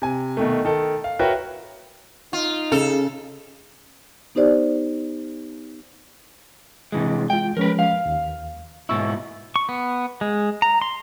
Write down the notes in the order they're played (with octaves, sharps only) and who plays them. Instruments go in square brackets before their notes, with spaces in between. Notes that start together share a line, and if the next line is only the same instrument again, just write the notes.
[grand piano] C3 G#5
B2 D#3 A3
D#3 A4
F5
F#4 A#4 B4 C#5 E5 G5
[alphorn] D#4 [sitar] F4
[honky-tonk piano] C#3 [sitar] A4
[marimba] B3 D#4 G4 C5 D5
[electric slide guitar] C3 E3 G#3
[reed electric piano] G#3 F4 [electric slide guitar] G5
[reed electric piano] F3 G#3 C#4 [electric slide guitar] A#4 B4
[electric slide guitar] F5
[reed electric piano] D#2
[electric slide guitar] G#2 B2 E4 [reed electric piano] C#6 E6
[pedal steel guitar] C#6
B3
G#3
A#5
C6